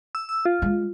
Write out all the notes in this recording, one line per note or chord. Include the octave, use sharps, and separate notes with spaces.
E6
E6
F4
G#3